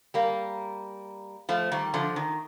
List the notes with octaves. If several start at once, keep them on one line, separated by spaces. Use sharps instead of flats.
G3 A#3
F3 A3
D#3 G3
D3 F3
D#3